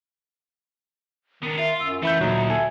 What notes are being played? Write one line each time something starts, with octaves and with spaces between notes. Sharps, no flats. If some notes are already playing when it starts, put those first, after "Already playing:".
D#3 B3 D4
F4 E5
F#2 E6
E3 A3 E5 B5 G6
D2 A#2 F#3 D#4
A4 G#5